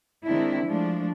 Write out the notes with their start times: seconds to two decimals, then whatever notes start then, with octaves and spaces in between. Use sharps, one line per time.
0.25 D#3 G#3 C4 D4 E4
0.64 F3 G#3 A3 D4